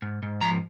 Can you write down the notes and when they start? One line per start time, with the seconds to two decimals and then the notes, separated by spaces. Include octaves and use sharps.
0.02 G#2
0.23 G#2
0.41 F3 A#5